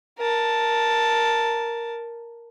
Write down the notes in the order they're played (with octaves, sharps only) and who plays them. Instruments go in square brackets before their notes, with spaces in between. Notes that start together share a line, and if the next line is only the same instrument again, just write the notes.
[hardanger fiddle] A#4 A5